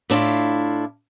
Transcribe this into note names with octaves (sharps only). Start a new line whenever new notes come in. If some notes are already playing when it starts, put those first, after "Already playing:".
A2 D4 E4 F4